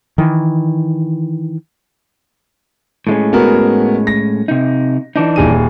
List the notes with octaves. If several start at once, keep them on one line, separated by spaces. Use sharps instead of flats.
D#3 E3
A2 G#3 C#4
B3 F#4 A#4
A#6
C3 D#4
E3 D4 D#4
D#1 G#4 D#7